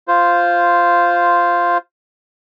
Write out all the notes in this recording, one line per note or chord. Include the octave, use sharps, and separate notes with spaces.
F4 C5